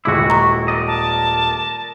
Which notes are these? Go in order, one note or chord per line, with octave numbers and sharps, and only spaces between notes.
D#1 G#3 E4 F#4 D6
A#5 C#6
A#4 D5 D#5
A5